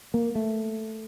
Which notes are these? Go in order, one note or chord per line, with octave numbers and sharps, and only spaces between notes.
A#3
A3